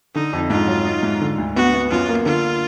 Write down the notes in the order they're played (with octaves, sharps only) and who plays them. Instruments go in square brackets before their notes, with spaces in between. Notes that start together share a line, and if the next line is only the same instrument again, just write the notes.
[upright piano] D3 [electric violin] D#4
[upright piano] F2
[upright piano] G#2 [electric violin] F4
[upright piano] F#3
D#4
G#2
D3
D2
[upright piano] B3 [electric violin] F#4
[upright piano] B3
[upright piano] F#2 [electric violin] F4
[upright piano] A#3
[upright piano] D3 [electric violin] F4